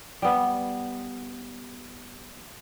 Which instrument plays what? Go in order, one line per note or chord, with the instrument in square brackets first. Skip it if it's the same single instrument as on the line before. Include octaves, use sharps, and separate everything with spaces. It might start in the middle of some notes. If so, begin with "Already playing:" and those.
[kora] G3 B3